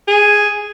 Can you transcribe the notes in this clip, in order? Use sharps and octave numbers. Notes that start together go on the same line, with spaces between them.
G#4